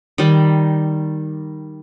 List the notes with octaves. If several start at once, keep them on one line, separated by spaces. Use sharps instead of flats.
D#3 G3